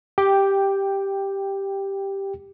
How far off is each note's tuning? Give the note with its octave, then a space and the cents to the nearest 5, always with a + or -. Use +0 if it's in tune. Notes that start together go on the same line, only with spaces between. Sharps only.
G4 +0 G5 +10